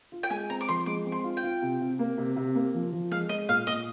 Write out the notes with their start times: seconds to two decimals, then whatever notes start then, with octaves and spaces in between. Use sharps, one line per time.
0.12 F4
0.23 G5
0.30 G#3 G#5
0.49 C4 A#5
0.61 D6
0.68 F3 C6
0.86 G#3 D6
1.05 C4
1.12 C6
1.24 F4
1.37 G5
1.43 F4
1.62 C3
1.81 C3
1.99 A#3
2.18 C3
2.36 C3
2.55 A#3
2.74 F3
2.92 F3
3.12 G#3 F5
3.29 G#3 D#5
3.49 A#2 F5
3.67 A#2 D#5